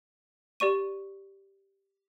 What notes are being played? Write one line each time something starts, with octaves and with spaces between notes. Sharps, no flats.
G4 D5 C#6 D#7